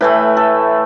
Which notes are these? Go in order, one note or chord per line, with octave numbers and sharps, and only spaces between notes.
A2 E3 A3 B4
A4